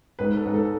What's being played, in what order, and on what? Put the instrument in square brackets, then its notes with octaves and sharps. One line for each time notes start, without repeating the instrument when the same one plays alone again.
[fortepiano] G#2 [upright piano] B4
[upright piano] A4
[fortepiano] G#2
[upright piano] A4